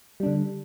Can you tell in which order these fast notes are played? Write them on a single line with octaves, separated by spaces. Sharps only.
G3 D4 D3